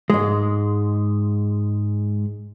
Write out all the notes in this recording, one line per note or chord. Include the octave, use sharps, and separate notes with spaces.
G#2 G#3